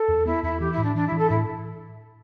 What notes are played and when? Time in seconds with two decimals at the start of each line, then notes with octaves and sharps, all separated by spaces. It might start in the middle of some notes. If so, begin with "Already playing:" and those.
Already playing: A4
0.08 E2
0.26 B3 E4
0.43 E2 E4
0.60 E3 G4
0.72 E4
0.78 A2
0.83 D4
0.95 E3 D4
1.07 E4
1.12 E3
1.18 A4
1.29 A2 E4